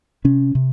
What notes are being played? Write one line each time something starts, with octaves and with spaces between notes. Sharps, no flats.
C3 C#4
C3